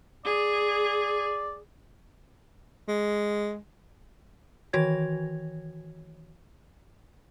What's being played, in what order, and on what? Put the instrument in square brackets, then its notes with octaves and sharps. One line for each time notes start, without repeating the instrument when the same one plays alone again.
[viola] G#4 [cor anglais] D5
[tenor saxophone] G#3
[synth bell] D#3 E3 F#4 C#5 G#6